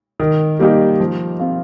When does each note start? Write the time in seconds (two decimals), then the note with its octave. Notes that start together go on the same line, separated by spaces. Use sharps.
0.20 D#3
0.59 G3 A#3 D#4 G4
1.00 F3
1.39 C4 F4